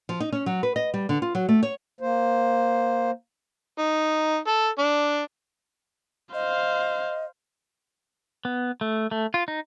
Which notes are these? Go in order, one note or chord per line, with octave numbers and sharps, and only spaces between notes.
F3
D#4
C#4
F#3
B4
D#5
G3
D3
F4
F#3
A3
C#5
A#3 C5
D#4
A4
D4
C5 D#5 F5
B3
A3
A3
F4
D#4